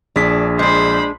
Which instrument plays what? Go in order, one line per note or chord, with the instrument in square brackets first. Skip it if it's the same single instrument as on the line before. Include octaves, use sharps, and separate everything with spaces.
[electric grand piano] A#1 G#4 B6 [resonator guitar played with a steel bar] D4
[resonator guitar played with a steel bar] G#3 D4 [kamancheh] C5 B5